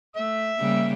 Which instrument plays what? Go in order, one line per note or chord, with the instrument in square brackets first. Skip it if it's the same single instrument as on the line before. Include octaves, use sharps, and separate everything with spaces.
[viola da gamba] A3 [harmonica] E5 E6
[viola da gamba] C#3 G3 A#3